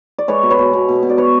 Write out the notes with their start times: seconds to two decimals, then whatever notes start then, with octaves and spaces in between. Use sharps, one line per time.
0.18 D5
0.28 G#3 B4 C#5
0.43 B2
0.50 B4 C#5
0.59 B2
0.73 B2
0.88 B2
1.03 B2
1.10 D5
1.18 B4 C#5